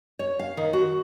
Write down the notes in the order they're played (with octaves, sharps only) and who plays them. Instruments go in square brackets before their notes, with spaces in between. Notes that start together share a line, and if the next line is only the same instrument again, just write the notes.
[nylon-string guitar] C#5
F5
D#3
F#4